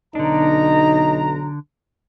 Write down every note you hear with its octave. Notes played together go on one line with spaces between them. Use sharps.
B1 D3 D4 D#4 A#5